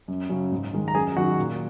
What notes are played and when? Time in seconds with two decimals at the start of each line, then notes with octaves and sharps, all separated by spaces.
0.08 F#2
0.30 C#3 F#3 C#4
0.52 G#2
0.73 D#3 G#3
0.88 A#5
0.94 F#2 G#4 G#5
1.17 D#3 F#3 D#4 F#4 F#5
1.38 A#2